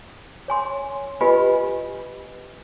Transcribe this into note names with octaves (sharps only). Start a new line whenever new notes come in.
C#5 G#5 C6
F4 G4 B4 D#5 G#5 B5